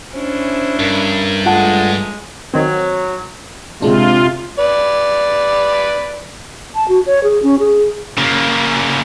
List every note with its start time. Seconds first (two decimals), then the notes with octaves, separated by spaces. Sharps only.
0.14 C#4 D4 E4 C5
0.80 G2 A#4
1.46 G#3 A3 F4 F#5 A5
2.54 D#3 F#3 C4
3.82 C3 G#3 D4 F4
4.59 B4 D5
6.75 A5
6.88 F#4
7.06 C#5
7.24 G#4
7.43 C#4
7.59 G#4
8.18 C#3 A#3